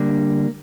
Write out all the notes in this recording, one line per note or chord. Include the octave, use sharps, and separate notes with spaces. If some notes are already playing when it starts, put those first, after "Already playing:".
Already playing: D3 G3 A#3 D4